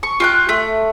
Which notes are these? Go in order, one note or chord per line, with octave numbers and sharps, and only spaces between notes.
C#6
F4 G5 F#6
A3